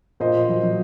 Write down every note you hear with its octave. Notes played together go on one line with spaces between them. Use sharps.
A#2 C5 D#5
A#2
F#3
F#3